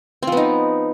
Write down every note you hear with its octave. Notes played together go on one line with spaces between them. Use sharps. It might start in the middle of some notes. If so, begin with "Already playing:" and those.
F3 B3 C4 D#4